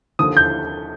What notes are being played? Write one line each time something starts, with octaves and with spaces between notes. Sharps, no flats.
D#2 D3 F3 D#6
G6